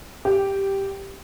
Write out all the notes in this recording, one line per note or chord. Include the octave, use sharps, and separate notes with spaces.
G4